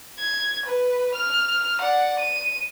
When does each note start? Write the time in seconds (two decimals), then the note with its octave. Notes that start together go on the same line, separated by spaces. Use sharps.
0.19 G#6
0.66 B4
1.14 F6
1.81 D5 F#5
2.19 D#7